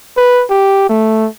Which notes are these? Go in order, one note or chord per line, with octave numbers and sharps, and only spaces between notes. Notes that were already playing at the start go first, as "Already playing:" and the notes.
B4
G4
A3